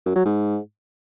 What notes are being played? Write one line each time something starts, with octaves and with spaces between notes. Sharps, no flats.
F#2
F#3
G#2